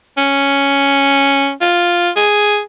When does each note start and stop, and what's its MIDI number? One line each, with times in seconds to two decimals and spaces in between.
0.18 1.52 61
1.61 2.10 65
2.16 2.60 68